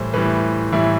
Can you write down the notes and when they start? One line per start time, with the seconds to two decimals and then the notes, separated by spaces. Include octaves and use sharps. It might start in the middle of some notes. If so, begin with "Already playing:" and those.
Already playing: A2 E3 G3 C5
0.14 A2 E3 G3 B4
0.72 A2 E3 G3 E4